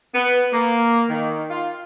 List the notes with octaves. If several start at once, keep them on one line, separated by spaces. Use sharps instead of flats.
B3
A#3
D#3
F4